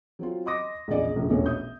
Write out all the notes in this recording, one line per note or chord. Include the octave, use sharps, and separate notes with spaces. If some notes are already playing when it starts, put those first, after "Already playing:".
F#3 C4 F4
D#5 C6 D6 D#6 A#6
A#1 E2 C#3 G#4 D5 D#5
F1 A#1 F#2
E1 A#1 A3 C#4 B4 C#5
E5 D#6 G6